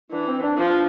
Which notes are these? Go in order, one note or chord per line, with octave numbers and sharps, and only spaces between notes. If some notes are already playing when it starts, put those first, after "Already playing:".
E3 D4
C4
D4
F3 D4